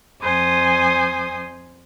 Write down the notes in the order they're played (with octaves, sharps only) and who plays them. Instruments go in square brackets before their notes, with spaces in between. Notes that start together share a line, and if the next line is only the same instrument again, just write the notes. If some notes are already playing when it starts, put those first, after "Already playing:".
[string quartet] F2 C5 G#5 D#6